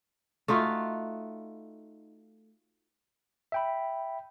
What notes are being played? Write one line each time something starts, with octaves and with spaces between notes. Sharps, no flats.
A3 D#4 F4 F#4
E5 G5 B5